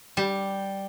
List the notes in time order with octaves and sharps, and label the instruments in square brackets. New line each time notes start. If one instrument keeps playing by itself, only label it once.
[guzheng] G3